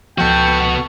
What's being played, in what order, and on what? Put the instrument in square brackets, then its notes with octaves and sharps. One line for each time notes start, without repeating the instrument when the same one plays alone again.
[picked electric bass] C#2 F3 [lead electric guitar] B3 F#4 [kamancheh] A4 C#6 [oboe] G5